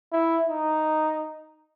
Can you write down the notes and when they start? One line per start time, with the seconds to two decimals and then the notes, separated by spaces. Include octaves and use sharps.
0.12 E4
0.48 D#4